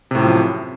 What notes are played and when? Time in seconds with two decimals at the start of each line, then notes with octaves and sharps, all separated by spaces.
0.11 C3
0.15 A2
0.19 F#2
0.23 F3